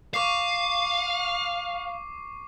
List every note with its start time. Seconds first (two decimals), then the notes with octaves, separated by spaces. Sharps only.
0.14 F5 C#6 D6 C7